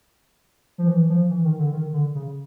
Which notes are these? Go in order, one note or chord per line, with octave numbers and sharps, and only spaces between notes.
F3
E3
F3
E3
D#3
D3
D#3
D3
C#3